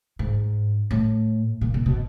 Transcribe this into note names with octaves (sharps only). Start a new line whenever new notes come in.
G#2
A2
A#2
A#2
B2